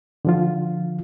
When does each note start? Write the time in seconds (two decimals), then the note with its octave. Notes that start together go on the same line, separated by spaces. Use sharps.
0.25 D3 F3 F4